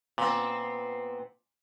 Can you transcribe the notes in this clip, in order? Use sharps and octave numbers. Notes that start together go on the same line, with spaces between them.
A#2 B3 C4